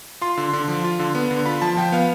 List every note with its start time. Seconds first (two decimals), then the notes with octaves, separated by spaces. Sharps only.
0.21 F4 C6
0.37 D3
0.53 D3
0.68 F3
0.84 F4
0.99 D3
1.15 B3
1.31 D3
1.46 F4 B5
1.62 F3 A5
1.77 F3 G5
1.92 B3 F5